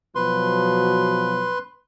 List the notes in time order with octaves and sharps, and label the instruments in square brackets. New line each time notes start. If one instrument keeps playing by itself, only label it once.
[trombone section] B2 F3 F#3 [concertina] B4 C6